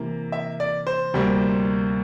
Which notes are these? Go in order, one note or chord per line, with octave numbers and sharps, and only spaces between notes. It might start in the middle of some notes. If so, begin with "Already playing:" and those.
Already playing: C3 E3 A#3
E5
D5
C5
D2 C3 G3 A#3